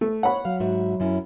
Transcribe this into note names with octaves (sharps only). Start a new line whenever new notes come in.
A3
C#5 F#5 B5
F#3 F5
G#2 F#4 E5
F#2 C#4 E4